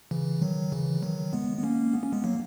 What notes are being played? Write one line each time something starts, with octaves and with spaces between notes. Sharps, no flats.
C#3 E3
D#3 F#3
C#3 E3
D#3 F#3
G#3 B3
B3
A#3 C#4
B3
C#4
G#3 B3
F#3 A#3